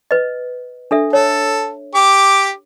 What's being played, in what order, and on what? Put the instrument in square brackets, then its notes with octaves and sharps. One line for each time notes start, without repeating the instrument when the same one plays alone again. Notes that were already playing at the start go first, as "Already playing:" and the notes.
[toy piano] B4 D#5
D4 A4 E5
[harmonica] A4 [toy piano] C#5
[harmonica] G4 D6